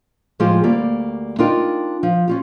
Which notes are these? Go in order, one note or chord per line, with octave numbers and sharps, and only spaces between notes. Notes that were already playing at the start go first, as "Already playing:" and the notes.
A2 F3 G#3 F4 G4 G#4
D2 G3 A#3 D5
D4 D#4 F4 A#4 G5
F3
C#4 F4 G4